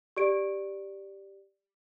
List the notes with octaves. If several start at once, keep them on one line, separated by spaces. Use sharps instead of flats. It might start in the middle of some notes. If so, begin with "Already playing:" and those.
G4 D5 D7